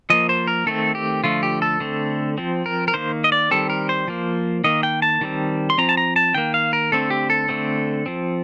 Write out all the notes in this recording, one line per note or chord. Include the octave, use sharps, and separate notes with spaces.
F3 A#3 D#5
C5
A#4
D#3 A3 C4 A4
G4
D3 F3 A3 F4
G4
A4
D3 A3 C4
F3 C4
A#4
A#4
D#3 A#3 C5
D#5
D5
D#3 G3 C4 A4
A#4
C5
F3 A#3
D#3 A#3 D#5
G5
A5
D#3 G3 C4
C6
F3 C4 A#5
A5
A#5
A5
D#3 A#3 G5
F5
A#4
D3 A3 C4 A4
G4
A4
D3 A3 C4
F3 C4